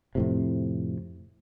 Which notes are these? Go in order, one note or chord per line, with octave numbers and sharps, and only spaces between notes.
F2 A2 C3